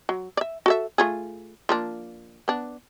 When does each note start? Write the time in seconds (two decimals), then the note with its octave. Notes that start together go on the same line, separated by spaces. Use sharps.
0.09 F#3
0.37 D5 E5
0.66 F#4 A4 E5
0.98 A3 F4 G#4
1.69 F3 A#3 D4
2.48 B3 D4